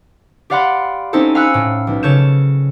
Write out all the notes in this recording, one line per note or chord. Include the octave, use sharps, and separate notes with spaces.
G4 D5 F5 F#5 B5 C6
C4 C#4 D#4 E4 A4 C5
F5 G#5 B5 E6 F#6 C#7
A2
B1
C#3 A4 C#5 G6 E7